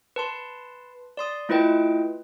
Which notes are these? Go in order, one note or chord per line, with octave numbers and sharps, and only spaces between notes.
B4 A5 C6
D5 C6 D#6
A3 E4 F4 B4 D#5 G5